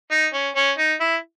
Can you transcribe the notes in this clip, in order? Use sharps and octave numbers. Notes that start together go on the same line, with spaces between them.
D#4
C#4
C#4
D#4
E4